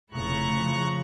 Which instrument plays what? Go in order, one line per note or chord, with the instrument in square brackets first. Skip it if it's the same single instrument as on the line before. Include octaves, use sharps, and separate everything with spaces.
[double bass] F1 C#3 [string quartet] A3 E4 [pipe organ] A#5 C#6 F#6
[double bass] C#3 F3